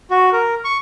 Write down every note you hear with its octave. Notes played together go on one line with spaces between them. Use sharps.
F#4
A#4
C#6